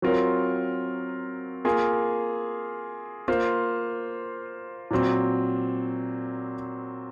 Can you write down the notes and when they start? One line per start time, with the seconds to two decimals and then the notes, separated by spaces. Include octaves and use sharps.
0.02 F#3 C4 F4 A#4 C#5
1.65 A#3 F4 G#4
3.28 A#3 F4 C5
4.91 A#2 F#3 C4